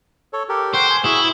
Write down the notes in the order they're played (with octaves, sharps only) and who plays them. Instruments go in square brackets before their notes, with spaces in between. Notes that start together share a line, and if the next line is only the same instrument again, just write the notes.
[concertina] A4 C#5
G4 A4 A#4
[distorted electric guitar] C5 [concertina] F#5 G5 C#6
[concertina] G#5 C6
[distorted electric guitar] E4 [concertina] F#4 G#4